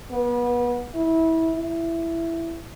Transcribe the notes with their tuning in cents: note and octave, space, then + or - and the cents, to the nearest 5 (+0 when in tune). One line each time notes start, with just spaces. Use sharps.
B3 -30
E4 -20
E4 +10